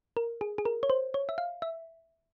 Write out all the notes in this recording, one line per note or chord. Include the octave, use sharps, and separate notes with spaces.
A#4
G#4
G#4
A#4
C#5
C5
C#5
E5
F5
E5